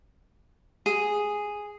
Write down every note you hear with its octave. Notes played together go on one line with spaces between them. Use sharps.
G#4